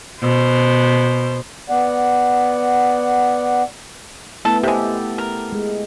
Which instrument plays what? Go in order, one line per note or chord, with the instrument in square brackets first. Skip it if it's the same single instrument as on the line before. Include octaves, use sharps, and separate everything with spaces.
[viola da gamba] B2 C5
[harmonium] B3 D5 F#5
[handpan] A3 B3 E4 [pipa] A4
[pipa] C3 G#3 [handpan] G4 A4
[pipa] A#4
[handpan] G#3